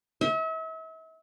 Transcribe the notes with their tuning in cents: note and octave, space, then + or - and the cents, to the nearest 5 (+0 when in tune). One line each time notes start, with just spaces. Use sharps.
E5 -40